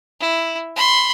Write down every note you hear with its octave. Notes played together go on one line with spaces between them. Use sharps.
E4
B5 C6